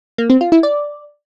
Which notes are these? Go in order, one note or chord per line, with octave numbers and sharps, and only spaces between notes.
A#3
C4
F4
E4
D5